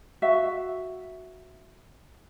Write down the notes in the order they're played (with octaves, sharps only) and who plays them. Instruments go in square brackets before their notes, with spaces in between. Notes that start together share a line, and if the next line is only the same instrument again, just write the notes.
[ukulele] F#4 E5 F5